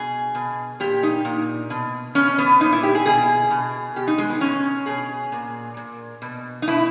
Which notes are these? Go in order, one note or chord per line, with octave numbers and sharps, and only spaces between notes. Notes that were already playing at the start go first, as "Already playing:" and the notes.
Already playing: B2 G#4
B2
A#2 G4
D#4
A#2
B2
B2 C#4
B3
A#2 D#4
E4
G4
G#4
B2 G#4
B2
B2 G4
D#4
G#3
B3
B2 C#4
B2 G#4
A#2
A#2
B2
D#4
B2 E4